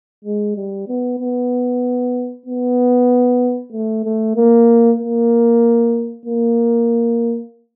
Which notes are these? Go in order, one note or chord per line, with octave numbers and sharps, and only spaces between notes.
G#3
G3
B3
B3
B3
A3
A3
A#3
A#3
A#3